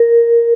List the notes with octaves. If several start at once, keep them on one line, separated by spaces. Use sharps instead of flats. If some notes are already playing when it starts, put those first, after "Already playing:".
Already playing: A#4